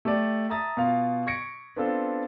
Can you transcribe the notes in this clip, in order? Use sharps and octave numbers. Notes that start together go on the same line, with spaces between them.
A3 G4 A4 D5
E5 A5 A#5 D#6 A6
B2 F4 F5
C#6 G#6 A#6 C#7 D7
B3 C4 D4 F4 A4